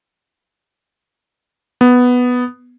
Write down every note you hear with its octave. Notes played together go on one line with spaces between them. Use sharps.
B3